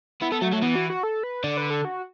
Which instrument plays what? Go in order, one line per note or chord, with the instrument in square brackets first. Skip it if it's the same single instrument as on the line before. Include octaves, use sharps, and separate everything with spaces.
[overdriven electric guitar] B3 [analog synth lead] E4
[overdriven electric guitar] B3 [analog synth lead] A4
[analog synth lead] F#3 [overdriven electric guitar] A3
[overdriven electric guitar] F#3 [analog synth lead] A3
[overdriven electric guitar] E3 [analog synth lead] B3
[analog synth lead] F#4
F#4
A4
B4
[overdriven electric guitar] D3 [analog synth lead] D5
[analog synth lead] B4
A4
F#4